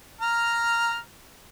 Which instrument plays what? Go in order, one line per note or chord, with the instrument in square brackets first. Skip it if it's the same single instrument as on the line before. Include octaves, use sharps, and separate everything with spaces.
[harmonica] A#5 F6